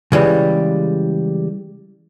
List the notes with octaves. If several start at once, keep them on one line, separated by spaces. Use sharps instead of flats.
C#3 E3 G3 G#3